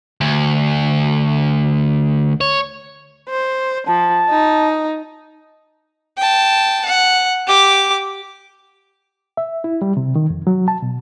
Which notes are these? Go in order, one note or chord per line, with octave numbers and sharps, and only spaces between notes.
D2
C#5
C5
F3 A5
D#4
G5 A5
F#5
G4 D6
E5
E4
G3
C3
D#3
F2
F#3
A5
B2